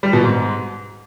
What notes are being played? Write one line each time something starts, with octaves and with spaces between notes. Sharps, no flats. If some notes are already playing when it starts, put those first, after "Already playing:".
G3
B2
G#2